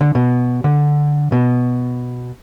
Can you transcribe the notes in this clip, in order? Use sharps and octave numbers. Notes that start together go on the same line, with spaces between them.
D3
B2
D3
B2